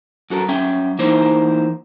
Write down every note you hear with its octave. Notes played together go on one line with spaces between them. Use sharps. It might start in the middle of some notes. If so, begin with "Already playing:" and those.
F#2 F#4 A4 A#4
F#2 C#4 E5 G5
E3 A#3 D#4 E4 C5